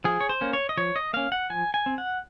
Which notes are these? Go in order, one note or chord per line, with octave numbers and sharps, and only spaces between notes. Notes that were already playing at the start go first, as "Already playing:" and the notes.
F3 G#4
C#5
C5
A#3 C#4
C#5
D#5
F3 C#5
D#5
A#3 C#4 F5
F#5
F3 G#5
G#5
C4
F#5